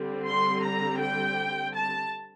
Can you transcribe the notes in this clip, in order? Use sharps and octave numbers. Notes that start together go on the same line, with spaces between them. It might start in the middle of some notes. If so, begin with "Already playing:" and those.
Already playing: D3 G3 C4
C6
A#5
G5
A5